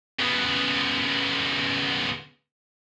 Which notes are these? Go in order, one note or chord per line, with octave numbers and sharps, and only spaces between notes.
C#3 B3